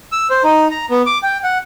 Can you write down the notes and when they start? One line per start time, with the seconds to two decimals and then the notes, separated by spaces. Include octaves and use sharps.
0.12 E6
0.30 C5
0.44 D#4
0.71 A#5
0.90 B3
1.07 D6
1.23 G5
1.44 F#5